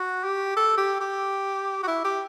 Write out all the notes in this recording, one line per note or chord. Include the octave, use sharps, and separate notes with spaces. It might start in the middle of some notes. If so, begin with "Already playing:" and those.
Already playing: F#4
G4
A4
G4
G4
F#4
E4
G4